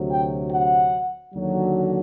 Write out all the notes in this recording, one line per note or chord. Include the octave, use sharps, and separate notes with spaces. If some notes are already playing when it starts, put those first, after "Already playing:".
Already playing: D2 C3 F#3
G5
F#5
D#2 D3 F#3